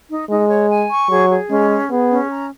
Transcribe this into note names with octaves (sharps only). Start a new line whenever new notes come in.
D#4
G#3 D#4
C#5
G#5
C#6
F#3 G#4
G#4
G#3 C#4
G#4
B3 G#4
C#4
A#5